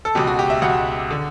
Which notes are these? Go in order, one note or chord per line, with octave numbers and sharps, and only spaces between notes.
A4
C#2 B2 G4
F#4
G4
E5
C#2 B2 F#5
D3